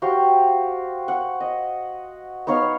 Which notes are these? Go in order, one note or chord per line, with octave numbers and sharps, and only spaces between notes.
F#4 G4 C5 F5
F#5
D#5
B3 D#4 C#5 F5